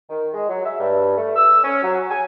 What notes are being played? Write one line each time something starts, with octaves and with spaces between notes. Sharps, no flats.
D#3
G#3
F#3
E5
G2
A3
E6
C#4
F#3
G#5